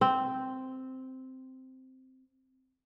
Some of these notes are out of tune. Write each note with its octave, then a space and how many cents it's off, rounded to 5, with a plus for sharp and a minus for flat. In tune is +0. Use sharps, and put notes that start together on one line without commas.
C4 -5